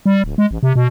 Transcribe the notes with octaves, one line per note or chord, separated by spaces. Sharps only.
G3
D1
G#3
A1
C3
B2